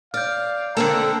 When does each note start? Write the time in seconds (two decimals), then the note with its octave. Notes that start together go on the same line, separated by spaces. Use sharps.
0.14 D5 F5 F6 G6
0.77 D3 A#3 C4 A4 A#4